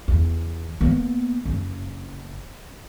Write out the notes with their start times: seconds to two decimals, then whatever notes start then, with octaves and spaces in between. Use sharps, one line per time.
0.08 E2
0.81 A#3 B3
1.46 F#1